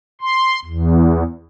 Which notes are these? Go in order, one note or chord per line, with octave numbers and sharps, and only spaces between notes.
C6
E2